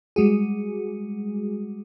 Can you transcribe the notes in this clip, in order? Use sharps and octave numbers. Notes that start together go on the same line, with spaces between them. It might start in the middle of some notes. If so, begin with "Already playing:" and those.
G3 G#3 F#4 G#4